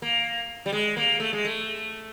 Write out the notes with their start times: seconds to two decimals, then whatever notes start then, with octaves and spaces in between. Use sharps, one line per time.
0.02 A#3
0.66 G3
0.72 G#3
0.97 A#3
1.20 A3
1.33 G#3
1.45 A3